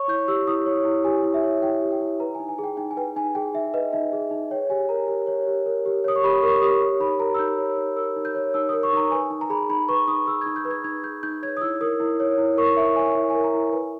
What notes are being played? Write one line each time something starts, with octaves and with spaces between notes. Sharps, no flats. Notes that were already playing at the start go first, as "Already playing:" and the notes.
Already playing: C#5 C#6
E4 G6
G4 E6
E4 D#6
C#5
E4
G4 G#5
E4
E5
C#5
E4 G5
G4
G5
E4
B4 A#5
G#5
D#4
G#5
G#4
G5
D#4 G5
G#5
B4 G5
D#4 G#5
G#4 G5
D#4 E5
B4 D#5
D#4 E5
G#4
D#4
C#5 G5
G4 G#5
A#4 A#5
G4
C#5
G4
A#4
G4
C#5 D#6
C#6
G4 B5
A#4 C#6
G4 D#6
C#5
D#4 B5
A#4 A#5
E6
D#4 G6
C#5
D#4
A#4 E6
D#4
G6
C#5
D#4 E6
A#4 D#6
C#6
D#4 A#5
B4 G#5
D#4
A#5
G#4 B5
D#4 B5
B4 C#6
D#4 D#6
G#4 E6
D#4 G#6
G6
B4
G#6
D#4 G#6
G#4 G6
D#4 G6
C#5 G#6
D#6
E4 E6
A#4 D#6
E4
C#5
E4
A#4 C#6
E4 E5
C#5 G#5
E4 E5
A#4 G#5
A#5
E4
B4 G#5